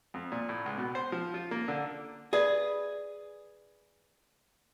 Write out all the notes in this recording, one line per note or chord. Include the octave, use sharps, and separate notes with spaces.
F2
A#2
A2
C#2
B2
C5
F3
F4
A#3
D3
G#4 B4 D5 E5